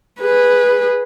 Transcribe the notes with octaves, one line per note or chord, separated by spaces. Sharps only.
G#4 B4